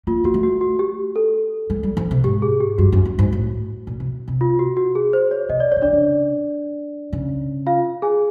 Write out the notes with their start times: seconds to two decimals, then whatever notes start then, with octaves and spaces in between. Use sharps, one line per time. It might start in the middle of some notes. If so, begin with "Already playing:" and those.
0.07 A#3 F4
0.24 A#3 F#4
0.34 A3
0.43 F#4
0.61 F#4
0.79 G4
1.16 A4
1.70 G#3
1.83 G3
1.97 F3
2.11 C3
2.24 G#2 G4
2.42 G#4
2.60 G4
2.78 G2 F#4
2.92 F#2
3.05 G2
3.19 G#2
3.32 A2
3.87 A#2
4.00 C3
4.28 C3
4.41 F4
4.59 F#4
4.77 F#4
4.95 G#4
5.13 C5
5.31 C#5
5.49 C3 D#5
5.60 D5
5.72 C#3 C#5
5.82 D3 D4 D5
5.93 C#3
7.13 C#3
7.66 F4 F5
8.02 G#4 G#5